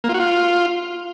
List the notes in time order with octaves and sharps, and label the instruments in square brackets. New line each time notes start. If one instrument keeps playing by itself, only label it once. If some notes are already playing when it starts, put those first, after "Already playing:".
[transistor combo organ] A#3
F4
F#4
F4